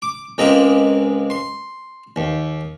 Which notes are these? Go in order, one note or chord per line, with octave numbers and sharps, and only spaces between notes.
D6
C#2 G#3 A#3 C4 D#5
C6
D#2